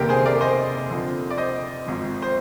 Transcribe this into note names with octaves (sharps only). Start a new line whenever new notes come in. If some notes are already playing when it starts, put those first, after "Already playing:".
Already playing: F1 D#2 D3 G4 A#4
G#4 C5
A#4 D5
C5 D#5
F2 D3 F3
D5
C5 D#5
G#1 G#2 F3
C5